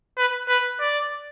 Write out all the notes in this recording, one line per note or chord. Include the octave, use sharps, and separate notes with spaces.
B4
B4
D5